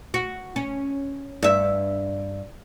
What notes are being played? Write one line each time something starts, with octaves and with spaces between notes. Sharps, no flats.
F#4
C#4
G2 E5